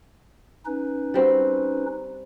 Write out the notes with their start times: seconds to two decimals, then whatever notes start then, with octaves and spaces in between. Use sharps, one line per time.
0.66 C#4 D#4 B4
1.14 G3 C4 F#4